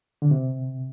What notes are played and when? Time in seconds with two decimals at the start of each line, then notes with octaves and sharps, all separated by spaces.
0.22 D3
0.31 C3